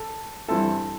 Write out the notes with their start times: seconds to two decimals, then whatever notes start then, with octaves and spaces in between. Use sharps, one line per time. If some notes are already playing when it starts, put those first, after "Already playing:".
Already playing: A4
0.48 G2 E3 G3 C4 E4 A4